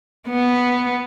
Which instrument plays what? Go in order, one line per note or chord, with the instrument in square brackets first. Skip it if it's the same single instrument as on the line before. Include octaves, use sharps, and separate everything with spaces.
[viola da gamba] B3